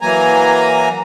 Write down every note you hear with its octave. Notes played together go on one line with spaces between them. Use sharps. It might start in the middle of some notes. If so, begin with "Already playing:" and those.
E3 F#3 A#3 G#5 A#5